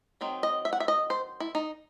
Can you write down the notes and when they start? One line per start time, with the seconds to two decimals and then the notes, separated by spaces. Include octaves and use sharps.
0.21 D#3 F#3 C4 D#4
0.43 D#5
0.65 E5
0.73 F#5
0.80 E5
0.88 D#5
1.10 C5
1.40 E4
1.55 D#4